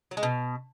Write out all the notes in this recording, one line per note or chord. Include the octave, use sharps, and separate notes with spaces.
F#3
G#3
B2